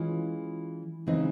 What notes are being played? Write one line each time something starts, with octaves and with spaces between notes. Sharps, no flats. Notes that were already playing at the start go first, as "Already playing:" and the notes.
Already playing: E3 G#3 C#4 F4
C#3 E3 G#3 C4 D#4